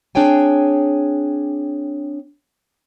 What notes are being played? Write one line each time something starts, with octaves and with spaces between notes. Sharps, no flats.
C4 D4 G#4 C#5 G5 G#5